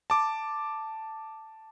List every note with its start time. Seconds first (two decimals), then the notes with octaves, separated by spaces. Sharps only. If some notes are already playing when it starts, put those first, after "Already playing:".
0.10 A5 D6